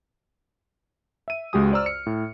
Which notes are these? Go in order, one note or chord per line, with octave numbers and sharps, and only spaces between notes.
E5 D#7
C#2 G#3 F#4 G4 G#5 D#6
C5 D5 A#5 E6 F6
C#7
A2